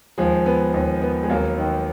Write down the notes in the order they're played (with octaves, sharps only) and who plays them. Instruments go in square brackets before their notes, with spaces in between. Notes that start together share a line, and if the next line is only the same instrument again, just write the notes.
[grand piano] D#2 [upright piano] F3 G#3
[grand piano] B3
D#2
B3
[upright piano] G#3
[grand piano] D#2 [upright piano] F#3 A#3
[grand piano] D#3